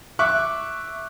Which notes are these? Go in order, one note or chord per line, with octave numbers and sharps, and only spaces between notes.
E5 C#6 D6 F#6